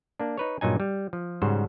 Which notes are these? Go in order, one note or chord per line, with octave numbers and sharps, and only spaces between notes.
A#3 D4
D#4 B4 C#5
G2 A#2 F#3 D#4 G#5
G3
F3
G#2 C#3 G3 F#4 C5